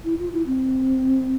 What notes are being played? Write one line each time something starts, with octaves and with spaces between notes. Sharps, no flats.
E4
F4
E4
C4